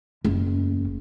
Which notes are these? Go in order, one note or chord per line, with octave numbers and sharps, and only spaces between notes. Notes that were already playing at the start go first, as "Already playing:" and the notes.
F#1 E2